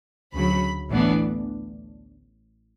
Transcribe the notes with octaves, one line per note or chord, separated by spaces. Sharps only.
D2 C#3 F#3 B5
A1 A2 E3 B3 D4